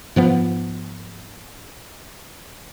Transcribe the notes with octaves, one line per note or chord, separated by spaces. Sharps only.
G#2 F3 B3